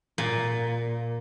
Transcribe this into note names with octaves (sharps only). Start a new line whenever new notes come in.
A#2